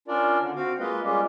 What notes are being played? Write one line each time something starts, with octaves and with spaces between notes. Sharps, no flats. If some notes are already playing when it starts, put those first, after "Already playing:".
C#4 D4 F4 A#4 D5
D3
C4 F#4 F5
G#3 A#3 F4 B4 D#5
G3 G#3 A#3 C#4 F4 G4